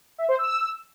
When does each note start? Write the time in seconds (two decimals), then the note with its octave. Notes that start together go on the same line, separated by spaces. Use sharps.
0.18 E5
0.29 C5
0.39 E6